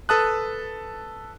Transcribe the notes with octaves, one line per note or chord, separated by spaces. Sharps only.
A4 B4 A5 D#6 F#6